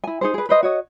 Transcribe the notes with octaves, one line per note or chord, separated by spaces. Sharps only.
E4 G#5
D#4 G#4 C5
G#4 B4
B4 C5 D#5
F#4 C#5 D#5